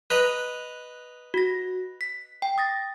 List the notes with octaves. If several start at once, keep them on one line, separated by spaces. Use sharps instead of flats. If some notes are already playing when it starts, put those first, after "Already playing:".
B4 D#5 A#5 F#6
F#4 A#6
B6
G5
D#6 A6 A#6